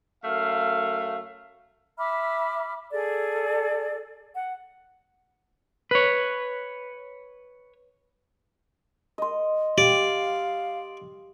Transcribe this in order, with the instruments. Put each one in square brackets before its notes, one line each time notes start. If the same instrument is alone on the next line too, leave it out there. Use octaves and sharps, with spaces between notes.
[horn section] F#2 A3 F5
[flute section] E5 B5 D6 F6
G#4 A4 D5
F#5
[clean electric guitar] B4 C#5
[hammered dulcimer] D#5 C6
[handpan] G4 [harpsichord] D5 [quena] F5